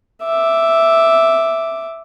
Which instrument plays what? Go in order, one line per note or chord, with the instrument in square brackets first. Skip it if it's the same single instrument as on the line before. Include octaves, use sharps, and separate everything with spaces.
[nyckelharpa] E5 D6